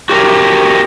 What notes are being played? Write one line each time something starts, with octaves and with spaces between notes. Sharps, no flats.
F#4 G4 A#4